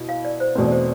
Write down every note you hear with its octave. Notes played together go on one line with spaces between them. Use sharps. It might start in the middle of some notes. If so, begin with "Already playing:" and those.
Already playing: B2 E4
F5
D5
C5
E2 B2 A3 C4 B4
D5
C5